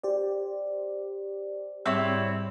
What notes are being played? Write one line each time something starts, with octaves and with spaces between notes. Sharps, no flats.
G4 C5 D5
G#2 G3 C4 E4 C#5